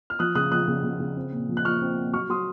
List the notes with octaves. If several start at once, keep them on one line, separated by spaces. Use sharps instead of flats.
F6
F3 D#6 F#6
C#3 D#6 F#6
F3 D#6 F#6
C#3
C#3
C#3
C4
A#2
F3
F#6
F3 C#6 F6
C4
A#2
F#3 C#6 F6
F#3 C6 D#6